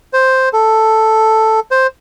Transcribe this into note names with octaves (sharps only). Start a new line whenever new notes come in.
C5
A4
C5